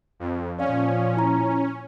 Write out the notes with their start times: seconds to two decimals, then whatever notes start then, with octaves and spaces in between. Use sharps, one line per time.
0.20 F2
0.59 A#2 F3 C#4 D5 F5
1.17 E4 A#5